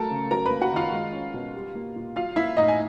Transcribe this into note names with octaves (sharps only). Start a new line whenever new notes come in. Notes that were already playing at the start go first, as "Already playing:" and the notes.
Already playing: F#3 A3 A4 A#4 A5 A#5
C#3
F#3 A#4 A#5
A#3 B4 B5
F#4 F#5
D#3 F4 F5
G#3
C#4
B2
G3
A#3
A#2
F#3 F4 F5
A#3 E4 E5
A2 D#4 D#5
G#5